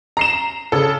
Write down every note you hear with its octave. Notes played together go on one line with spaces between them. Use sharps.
A#5 C7 E7
C#3 A4